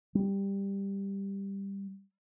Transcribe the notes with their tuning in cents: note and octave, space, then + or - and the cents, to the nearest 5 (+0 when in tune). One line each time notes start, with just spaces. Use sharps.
G3 +10